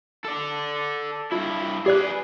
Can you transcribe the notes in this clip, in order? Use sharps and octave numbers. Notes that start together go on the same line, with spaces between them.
A4 D5
G2 E4 F4
G4 G#4 B4 D5 F#6